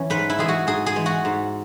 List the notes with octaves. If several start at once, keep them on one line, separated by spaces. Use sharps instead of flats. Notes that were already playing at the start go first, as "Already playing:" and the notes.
Already playing: E3 C#4
G#2 B4
E4
E3 G#3 G#4
F#4
G#2 G#4
G#4
E3 G#3
F#4
G#2